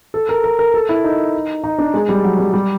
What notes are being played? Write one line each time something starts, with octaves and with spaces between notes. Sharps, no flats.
A4
A#4
A#4
A#4
A4
E4
D#4
D#4
D4
G#3
G3
F#3
G3
G3